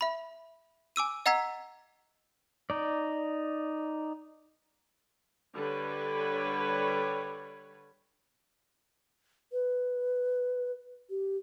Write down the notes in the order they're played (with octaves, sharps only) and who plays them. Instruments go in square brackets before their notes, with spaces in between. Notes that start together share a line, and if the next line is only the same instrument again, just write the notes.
[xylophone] E5 B5
G#5 D6 E6 D#7
D#5 F#5 A#5 E6 G#6 B6
[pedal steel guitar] D#4 D5
[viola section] D3 G3 B4 C#5
[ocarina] B4
G4